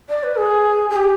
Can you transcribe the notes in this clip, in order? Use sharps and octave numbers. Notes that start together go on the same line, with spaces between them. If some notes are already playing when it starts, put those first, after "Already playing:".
D5
B4
G#4
G#4
G4